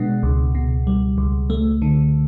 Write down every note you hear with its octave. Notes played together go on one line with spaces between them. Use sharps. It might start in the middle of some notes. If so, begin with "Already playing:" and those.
Already playing: B2 G#3 B3 D4
C#2
B2
G3
C#2
A3
D3